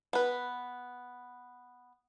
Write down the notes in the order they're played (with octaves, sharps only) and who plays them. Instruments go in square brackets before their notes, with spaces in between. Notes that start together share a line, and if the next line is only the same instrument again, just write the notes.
[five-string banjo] B3 B4